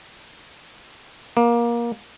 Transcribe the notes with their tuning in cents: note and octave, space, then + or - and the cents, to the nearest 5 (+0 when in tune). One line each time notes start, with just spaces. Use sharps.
A#3 +20